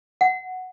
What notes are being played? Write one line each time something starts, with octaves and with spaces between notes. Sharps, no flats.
F#5